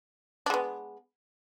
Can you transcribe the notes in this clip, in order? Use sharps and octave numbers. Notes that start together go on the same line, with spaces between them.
G#3 B3 D4